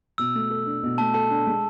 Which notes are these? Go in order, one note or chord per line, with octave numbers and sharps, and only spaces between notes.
B2 E6
A3
A4
D4
B2
A3 A5
A4 A5
D4
G#3